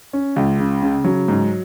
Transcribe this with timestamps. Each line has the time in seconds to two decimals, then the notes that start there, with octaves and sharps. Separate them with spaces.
0.13 C#4
0.36 C#2
0.59 C#3
0.83 C#3
1.04 F#3
1.28 G#2